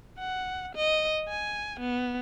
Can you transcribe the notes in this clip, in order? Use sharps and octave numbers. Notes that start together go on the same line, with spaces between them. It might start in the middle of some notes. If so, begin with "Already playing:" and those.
F#5
D#5
G#5
B3